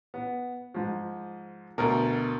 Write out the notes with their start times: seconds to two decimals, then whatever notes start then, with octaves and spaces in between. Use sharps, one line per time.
0.14 B3
0.74 G#2 F3
1.78 D2 B2 A#4